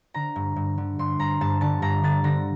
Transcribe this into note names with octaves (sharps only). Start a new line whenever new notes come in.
D3 A#5
G2
G2
D3
G2 C6
G2 A#5
G2 A5
D3 A5
G2 A#5
D3 A6
D3 A#6